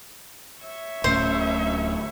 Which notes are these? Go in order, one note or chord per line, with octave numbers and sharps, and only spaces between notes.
C#5 E5
D1 A2 C#4 C5